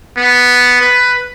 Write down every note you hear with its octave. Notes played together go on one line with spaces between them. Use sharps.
B3
B4